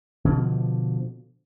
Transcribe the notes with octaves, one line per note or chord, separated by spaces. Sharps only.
B2 D3 F3